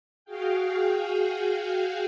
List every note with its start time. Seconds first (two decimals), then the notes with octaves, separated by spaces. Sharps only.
0.25 F#4 G#4 F5 G5